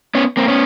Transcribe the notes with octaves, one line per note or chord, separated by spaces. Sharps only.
B3 C#4
A#3 C4
B3 C#4